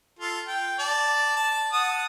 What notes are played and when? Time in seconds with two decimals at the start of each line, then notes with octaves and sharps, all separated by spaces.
0.20 F4 A4
0.47 G5
0.79 D5 A5
1.36 A5
1.73 F#5 A5 D#6